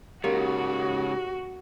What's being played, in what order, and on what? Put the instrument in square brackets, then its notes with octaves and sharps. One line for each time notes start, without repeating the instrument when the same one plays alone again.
[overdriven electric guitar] G#2 C#3 [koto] A#3 [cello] F#4 [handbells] G4